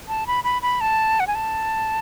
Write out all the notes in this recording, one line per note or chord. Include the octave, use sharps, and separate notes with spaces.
A5
B5
B5
B5
A5
F#5
G#5
A5